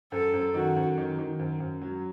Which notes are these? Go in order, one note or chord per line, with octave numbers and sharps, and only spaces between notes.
F#2 A4
F#2
D#3 F#4
F#2
D#3
D#3
F#2
F#2
F#3